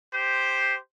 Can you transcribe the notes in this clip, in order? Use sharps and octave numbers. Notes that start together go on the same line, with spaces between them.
G4 C5